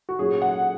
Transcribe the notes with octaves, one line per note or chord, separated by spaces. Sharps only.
F#4
A#2 F#3 C#4 G#4
F#5